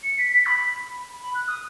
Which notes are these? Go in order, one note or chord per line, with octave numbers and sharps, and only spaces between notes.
C#7
B6
B6
B5
B5
F#6
D#6